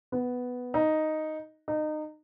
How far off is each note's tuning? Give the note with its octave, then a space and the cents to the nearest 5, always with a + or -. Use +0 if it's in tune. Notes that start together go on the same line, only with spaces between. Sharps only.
B3 +5
D#4 +0
D#4 -25